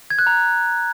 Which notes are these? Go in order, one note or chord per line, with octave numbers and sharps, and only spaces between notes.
G#6
F#6
A#5